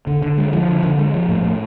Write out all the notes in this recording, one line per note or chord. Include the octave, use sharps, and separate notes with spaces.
D3
D3
G#3
F3
D3
D3
G#3
F3
A2
A2